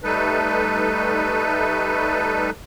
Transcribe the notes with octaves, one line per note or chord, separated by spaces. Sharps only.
G3 A3 D#4 A4 B4